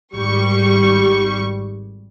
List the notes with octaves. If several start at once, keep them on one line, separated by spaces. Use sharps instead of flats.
G#1 G3 C#6